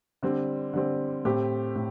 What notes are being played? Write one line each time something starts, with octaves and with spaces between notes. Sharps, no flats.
D3 G3 C4
D3 G3 C4
A2 A3 C4 G4
A2